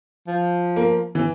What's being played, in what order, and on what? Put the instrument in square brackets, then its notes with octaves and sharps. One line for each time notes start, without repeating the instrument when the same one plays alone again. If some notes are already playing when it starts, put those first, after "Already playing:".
[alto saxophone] F3
[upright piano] A#3
E3